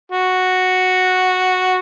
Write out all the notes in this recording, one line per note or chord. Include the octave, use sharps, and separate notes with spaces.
F#4